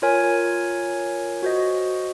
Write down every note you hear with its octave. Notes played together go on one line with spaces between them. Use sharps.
F4 A#4 C#5 G#5
F#4 C5 D#5